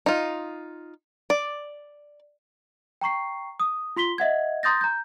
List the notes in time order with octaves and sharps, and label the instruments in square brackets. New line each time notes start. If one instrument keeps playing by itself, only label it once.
[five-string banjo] D#4 F4
D5
[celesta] G5 A#5 C#6 C7
D#6
F4 C6 B6 G7
D#5 E5 F#5 G#6
A#5 C6 D#6 G6 A6 A#6
A#5 G6